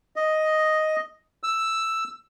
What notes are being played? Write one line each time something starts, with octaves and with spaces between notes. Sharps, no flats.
D#5
E6